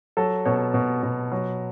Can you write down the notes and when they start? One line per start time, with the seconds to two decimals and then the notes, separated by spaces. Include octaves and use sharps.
0.17 F#3 A4
0.46 B2 C#5
0.74 B2
1.03 B2
1.32 F#3